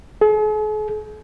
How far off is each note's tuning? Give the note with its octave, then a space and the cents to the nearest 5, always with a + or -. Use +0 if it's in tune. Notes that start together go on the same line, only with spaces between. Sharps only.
G#4 +45